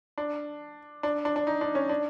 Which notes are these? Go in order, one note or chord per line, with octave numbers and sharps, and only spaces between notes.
D4
D4
D4
D4
D#4
D4
C#4
D4